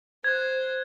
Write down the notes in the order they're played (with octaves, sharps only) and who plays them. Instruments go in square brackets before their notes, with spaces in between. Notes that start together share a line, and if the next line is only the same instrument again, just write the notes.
[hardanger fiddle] C5 [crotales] F#6 G#6